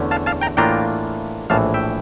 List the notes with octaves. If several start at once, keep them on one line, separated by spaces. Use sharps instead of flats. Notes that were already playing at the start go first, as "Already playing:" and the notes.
Already playing: E2 D3 A3 C#4
F5 A5
F5 A5
G5 A#5
A2 E3 A#3 D4 F4 G5 A#5
A#1 A2 E3 F5 A5
E5 G5